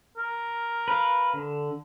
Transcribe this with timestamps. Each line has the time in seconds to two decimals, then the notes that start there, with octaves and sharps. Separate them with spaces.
0.17 A#4
0.88 B4 F5
1.34 D3